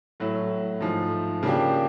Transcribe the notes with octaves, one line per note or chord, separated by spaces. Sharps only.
A2 F#3 A3
G#2 F3 A3
C#3 F3 A#3 D4 G4